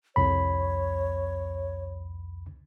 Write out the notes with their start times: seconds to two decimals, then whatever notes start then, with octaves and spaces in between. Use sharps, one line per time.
0.16 C2 F2 C#5 B5